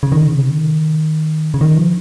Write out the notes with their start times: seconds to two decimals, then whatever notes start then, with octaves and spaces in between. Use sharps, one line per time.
0.03 C#3
0.12 D#3
0.25 C#3
0.37 C3
0.50 D#3
1.54 C#3
1.61 D#3
1.77 F3